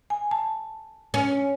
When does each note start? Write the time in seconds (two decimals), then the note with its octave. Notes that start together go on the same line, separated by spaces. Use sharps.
0.10 G#5
0.31 A5
1.14 C#4